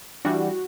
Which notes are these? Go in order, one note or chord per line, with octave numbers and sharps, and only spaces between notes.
E3 G3 D4 F#4